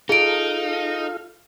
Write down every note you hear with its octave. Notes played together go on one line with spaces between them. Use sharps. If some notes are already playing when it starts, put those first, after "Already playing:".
D#4 F4 G#4 A4 F5 D7